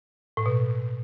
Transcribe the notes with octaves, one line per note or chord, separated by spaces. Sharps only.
A2
B2